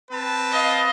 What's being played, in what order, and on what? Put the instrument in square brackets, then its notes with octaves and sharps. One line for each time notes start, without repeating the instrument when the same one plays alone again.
[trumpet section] C4 B4 A5
[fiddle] D#5 F5